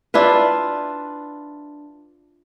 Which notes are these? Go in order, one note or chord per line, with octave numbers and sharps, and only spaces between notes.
D4 E4 F4 B4